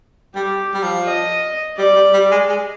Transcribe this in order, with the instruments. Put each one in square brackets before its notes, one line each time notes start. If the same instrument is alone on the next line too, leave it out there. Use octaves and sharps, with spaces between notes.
[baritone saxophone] G3 [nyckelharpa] G4
[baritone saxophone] G3
F3
[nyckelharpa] D#5
[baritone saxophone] G3 [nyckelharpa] D5
[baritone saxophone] G3
G3
G#3
G#3